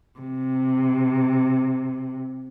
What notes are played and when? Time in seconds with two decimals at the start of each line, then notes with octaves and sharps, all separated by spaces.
0.20 C3